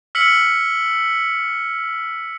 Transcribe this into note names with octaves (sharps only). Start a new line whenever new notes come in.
E6 F6 B6 C#7 F#7